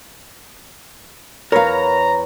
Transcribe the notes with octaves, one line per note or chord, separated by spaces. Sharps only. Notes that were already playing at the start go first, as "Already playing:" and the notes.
E2 A#4 B4 C#5 F5 A#5